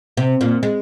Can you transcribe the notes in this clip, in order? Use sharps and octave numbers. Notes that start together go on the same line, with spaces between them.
C3
A#2
G#3